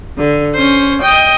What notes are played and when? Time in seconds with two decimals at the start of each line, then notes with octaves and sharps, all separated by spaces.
0.18 D3
0.55 C#4 C5
1.03 D#5 G5